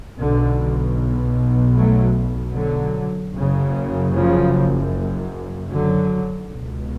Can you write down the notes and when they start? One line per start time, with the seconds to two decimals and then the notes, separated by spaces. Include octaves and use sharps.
0.19 B1 B2 D3
1.76 F#3 A3
2.55 D3 F#3
3.34 F#1 F#2 C#3
4.13 C#3 F3
5.70 D3 F#3
6.49 C#2 B2